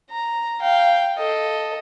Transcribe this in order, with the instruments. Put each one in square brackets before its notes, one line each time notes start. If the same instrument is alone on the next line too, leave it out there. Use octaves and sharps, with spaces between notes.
[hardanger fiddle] A#5
F5 G5
A4 D#5